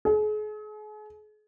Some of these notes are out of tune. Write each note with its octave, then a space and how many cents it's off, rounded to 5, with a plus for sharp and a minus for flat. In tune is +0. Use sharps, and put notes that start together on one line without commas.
G#4 +40